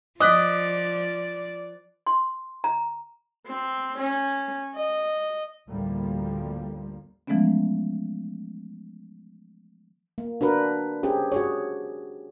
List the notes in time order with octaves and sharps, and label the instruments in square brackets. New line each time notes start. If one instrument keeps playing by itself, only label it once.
[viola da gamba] F3 D5 [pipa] D#5 [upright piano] D6 F#6 B6
[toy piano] C6
A#5
[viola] C4
C#4
D#5
[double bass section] A1 D2 A2 F3 G3 A#3
[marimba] E3 F3 G#3 A3 B3 C#4
[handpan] A#3
D4 F#4 A#4 B4
C4 C#4 G4 G#4
F#4 G#4 C#5